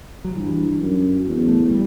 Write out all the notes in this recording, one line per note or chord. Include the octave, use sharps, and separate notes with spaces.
F#3
G2 E3
F#2
E2
A3
G3